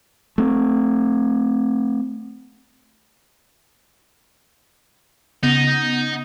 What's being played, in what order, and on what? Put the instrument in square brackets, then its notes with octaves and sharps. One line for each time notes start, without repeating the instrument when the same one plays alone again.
[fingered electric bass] A3 C4
[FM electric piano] C#3 [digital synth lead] B3 [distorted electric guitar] D#4